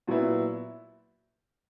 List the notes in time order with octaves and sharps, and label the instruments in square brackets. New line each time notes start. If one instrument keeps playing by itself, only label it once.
[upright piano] A#2 F#3 B3 E4